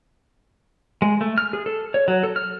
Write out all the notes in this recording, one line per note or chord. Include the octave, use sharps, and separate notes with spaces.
G#3
A3
F6
G#4
A4
C#5
F#3
A4
F6